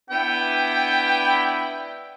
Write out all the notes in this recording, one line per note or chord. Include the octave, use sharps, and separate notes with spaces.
B3 D4 E4 G5